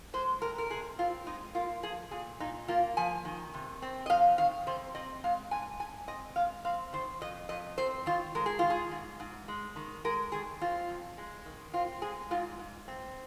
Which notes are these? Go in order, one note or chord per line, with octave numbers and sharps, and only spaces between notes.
G#3 C5
C3 A#4
A#4
C3 G#4
C4 F4
G#3 D#4
A#3 F4
F3 G#4
A#2 G#4
A#2 D#4
A#3 F4
F3 G#5
D#3
C3
C4
D#5
F2 F5
D#3 F5
C3 C5
C4 D#5
G#3 F5
G#2 G#5
G#2 G#5
C4 D#5
G#3 F5
C4 F5
D#3 C5
F2 D#5
F2 D#5
C4 C5
D#3 F4
G#3 A#4
G#4
D#3 F4
G#4
G#2
G#2
G#3
D#3
G#3 A#4
D#3 G#4
C4 F4
F2
G#3
D#3
C4 F4
G#3 G#4
G#2 F4
G#2
C4